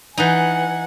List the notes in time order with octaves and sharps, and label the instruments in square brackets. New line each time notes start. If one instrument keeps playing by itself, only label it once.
[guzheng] E3 D#4 [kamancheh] F#5 G#5